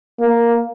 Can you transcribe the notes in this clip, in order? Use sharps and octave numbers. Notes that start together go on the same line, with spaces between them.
A#3